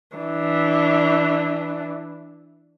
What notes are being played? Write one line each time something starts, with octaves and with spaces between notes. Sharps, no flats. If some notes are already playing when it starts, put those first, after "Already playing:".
E3 D4